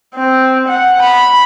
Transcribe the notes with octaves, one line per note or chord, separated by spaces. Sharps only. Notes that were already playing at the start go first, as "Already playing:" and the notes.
C4
F#5
B5